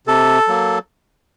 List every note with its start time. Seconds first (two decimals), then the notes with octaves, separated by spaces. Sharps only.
0.07 C3 A4
0.47 F#3 A#3